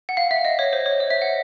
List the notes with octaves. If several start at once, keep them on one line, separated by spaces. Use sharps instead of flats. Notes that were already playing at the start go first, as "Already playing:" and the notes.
F#5
F5
E5
D#5
C#5
C5
C#5
D#5
E5
F#5